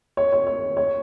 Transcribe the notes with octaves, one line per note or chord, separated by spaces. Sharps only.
C#5
C#5
C#5
C#5